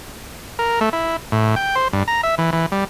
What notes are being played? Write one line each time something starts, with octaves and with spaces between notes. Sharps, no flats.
A#4
A3
E4
A2
G5
C5
G2
A#5
E5
E3
E3
G3